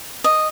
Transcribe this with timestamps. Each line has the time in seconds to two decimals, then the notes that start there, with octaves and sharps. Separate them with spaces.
0.24 D#5